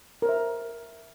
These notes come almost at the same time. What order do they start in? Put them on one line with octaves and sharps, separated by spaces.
A#4 C5 E5